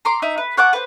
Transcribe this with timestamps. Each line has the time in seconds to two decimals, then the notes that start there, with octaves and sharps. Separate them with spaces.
0.05 A#5 C6 D6
0.22 D#4 E4
0.38 B4
0.57 C#5 F#5 A5 D6
0.73 B4 C5